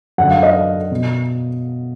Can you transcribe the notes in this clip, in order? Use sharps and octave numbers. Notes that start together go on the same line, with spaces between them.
F#2 D3 F#5
F5
D#5
B2